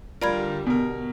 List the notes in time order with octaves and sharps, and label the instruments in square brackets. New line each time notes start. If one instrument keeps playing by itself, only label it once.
[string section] D3 G3 [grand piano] F4 A#4 [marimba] D5 B5 G#6
[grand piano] B2 A#4 [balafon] B3 A#5